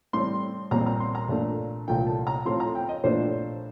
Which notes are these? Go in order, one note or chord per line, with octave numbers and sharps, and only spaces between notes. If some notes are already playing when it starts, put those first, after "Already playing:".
A2 G3 C4 C6
A#1 A#2 G3 C4 A#5
A#5
C6
A#5
A#1 A#2 A3 D4
C2 A#2 F3 A3 G5
A5
A#5
A2 F3 A3 C4 C6
A#5
G5
D#5
A#1 A2 F3 A3 D4 C5